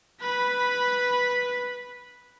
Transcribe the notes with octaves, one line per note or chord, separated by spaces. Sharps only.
B4 B5